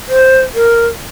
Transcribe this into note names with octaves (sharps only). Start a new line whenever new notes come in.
C5
A#4